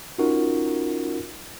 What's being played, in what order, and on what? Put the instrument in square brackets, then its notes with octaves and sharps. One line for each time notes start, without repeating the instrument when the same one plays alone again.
[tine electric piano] C#4 D#4 F4 F#4 A#4